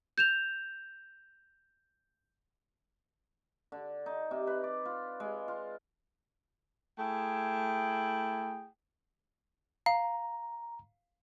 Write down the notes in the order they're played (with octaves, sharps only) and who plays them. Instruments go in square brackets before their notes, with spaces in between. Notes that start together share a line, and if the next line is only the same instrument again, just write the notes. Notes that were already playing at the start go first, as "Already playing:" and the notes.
[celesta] G6 E7 F7
[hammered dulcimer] D3
D#4
C3
B4
D5
F4
G#3
F4
[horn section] A3 E4 G#4 G5
[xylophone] F5 [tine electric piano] A#5